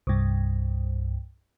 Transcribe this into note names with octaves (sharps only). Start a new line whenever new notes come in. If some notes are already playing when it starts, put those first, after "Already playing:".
C2 G2